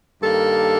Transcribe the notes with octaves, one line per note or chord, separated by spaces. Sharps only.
G2 D#3 G3 A#3 A4